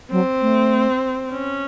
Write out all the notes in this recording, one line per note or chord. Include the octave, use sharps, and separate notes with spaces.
F#3 C4
A3
C#4